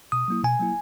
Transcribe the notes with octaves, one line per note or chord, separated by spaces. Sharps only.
B2 D#6
F#3 A#3 E4
B2 G#5
F#3 A#3 E4